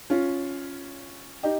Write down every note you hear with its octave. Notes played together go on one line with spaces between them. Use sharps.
C#4 F4
D#4 G4